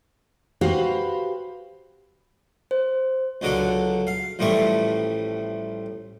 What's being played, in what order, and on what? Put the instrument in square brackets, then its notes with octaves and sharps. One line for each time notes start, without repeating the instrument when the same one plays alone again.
[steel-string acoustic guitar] F#4 G4 B4 C5 F5
[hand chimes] C5
[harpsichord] C#2 D3 F#3 D4 A4
F5
A1 A2 F3 G3 A3 C#6